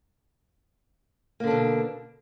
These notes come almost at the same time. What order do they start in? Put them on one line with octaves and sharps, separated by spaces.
A#3 D3 D4 B2